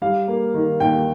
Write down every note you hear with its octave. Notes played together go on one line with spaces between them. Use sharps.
G3 F5
A#3
D#3
D#2 G5